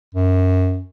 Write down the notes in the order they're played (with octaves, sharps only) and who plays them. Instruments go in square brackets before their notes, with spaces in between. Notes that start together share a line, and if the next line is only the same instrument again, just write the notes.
[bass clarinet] F#2